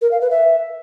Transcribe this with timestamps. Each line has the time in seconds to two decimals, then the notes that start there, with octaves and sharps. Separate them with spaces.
0.02 A#4
0.11 F5
0.21 B4
0.31 E5